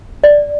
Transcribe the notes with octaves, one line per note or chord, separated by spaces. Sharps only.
D5